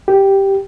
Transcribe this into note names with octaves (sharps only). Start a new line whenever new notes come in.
G4